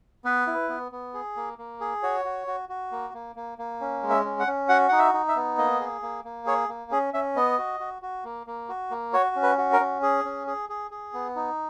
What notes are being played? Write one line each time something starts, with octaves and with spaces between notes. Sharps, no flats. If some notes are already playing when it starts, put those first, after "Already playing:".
B3 B4
E4
B3
B3
G#4
A#3
A#3
G#4
F#4 C#5
F#4
F#4
F#4
A#3
A#3
A#3
A#3
C#4
G#3
E5
C#4
F#5
C#4
F#4 F#5
D#4 F#5
E5
D#4
E5
B3
A#3 D#5
G#4
A#3
A#3
G#4 C#5
A#3
C#4 G#4
C#4 E5
B3 D#5
F#4
F#4
F#4
A#3
A#3
F#4
A#3
F#4 C#5
C#4
B4
F#4
A#4
C#4
G#4
C#4
G#4
G#4
G#4
B3
D#4